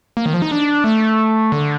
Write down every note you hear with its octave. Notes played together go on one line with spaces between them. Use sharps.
A#3
D#3
F3
D#4
D4
A3
D3